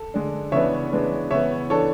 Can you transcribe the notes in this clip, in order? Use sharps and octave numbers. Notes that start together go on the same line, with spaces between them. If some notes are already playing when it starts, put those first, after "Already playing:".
Already playing: A4
D3 G#3 D4
C#3 E3 B3 D4 C#5 E5
E3 G#3 B3 D4
C#3 E3 B3 C#5 E5
E3 B3 D4 A4 C#5